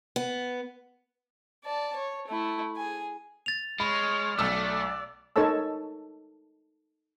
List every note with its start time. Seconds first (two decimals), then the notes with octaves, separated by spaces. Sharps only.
0.16 B3
1.64 D5 A5
1.96 C#5
2.27 A3 E4
2.76 G#4 G#5
3.46 A6 F7
3.80 G#3 C#5 B5 F6
4.39 B1 A3 D5 E6
5.36 D#4 A4 A#4 C#5 A5 E6